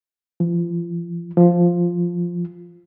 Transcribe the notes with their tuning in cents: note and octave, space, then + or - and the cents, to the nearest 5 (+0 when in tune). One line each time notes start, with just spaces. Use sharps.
F3 -30
F3 +0